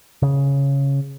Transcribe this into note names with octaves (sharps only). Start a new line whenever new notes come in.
C#3